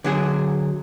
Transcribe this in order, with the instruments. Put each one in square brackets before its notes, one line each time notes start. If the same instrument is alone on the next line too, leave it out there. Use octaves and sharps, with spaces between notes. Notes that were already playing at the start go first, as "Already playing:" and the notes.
[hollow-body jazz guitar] D3 F#3 G#4